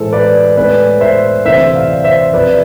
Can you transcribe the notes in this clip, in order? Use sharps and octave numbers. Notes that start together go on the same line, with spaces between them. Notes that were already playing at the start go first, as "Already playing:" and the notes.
Already playing: A2 E3 G#3 A4 C5
B4 D5
A2 G#3 B3 B4 D5
C5 E5
D2 C3 E3 C5 E5
D5 F5
C5 E5
C2 C3 F3 B4 D5